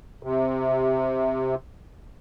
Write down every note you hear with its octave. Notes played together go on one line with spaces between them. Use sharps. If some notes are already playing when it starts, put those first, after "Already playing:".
C3